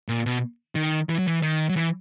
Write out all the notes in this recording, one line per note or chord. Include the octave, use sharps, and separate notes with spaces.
A#2
B2
D#3
E3
F#3
E3
D#3
F#3
E3